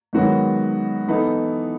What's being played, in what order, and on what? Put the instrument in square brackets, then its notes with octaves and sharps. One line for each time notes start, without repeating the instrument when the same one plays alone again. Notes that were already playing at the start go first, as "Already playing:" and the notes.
[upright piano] G#2 D#3 F#3 B3 F#4
E3 B3 D#4 A4